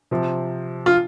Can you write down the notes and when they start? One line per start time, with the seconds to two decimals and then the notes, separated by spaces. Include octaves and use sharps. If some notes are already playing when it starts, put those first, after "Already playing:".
0.11 C3 F3
0.86 F4